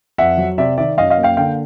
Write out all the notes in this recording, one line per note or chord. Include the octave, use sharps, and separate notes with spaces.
F2 E5 F#5
F#3
C3 D5 E5
D#3 D5 E5
F#2 D#5 F5
D#5 F5
A#3
F5 G5
D3 F5 G5